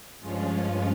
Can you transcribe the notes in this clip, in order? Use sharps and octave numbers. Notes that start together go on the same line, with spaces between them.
G2 F3 G#3 C#4 F4